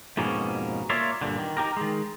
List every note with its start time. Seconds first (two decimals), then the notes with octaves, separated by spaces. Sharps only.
0.17 F2 G#2 B2 A#3 C#4
0.90 A#3 F4 C#5 D5 E5 F5
1.21 G2 A#2 D3
1.39 D#3
1.57 D#4 F#4 G4 A#4
1.77 D#3 G#3